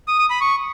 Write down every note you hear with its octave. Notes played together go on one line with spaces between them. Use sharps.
D#6
D#6
B5
C#6